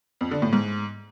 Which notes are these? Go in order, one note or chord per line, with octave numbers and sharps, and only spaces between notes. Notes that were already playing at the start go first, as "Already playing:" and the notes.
F2
D3
A2
G#2